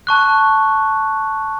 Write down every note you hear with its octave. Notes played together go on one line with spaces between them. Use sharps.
A5 C#6 F#6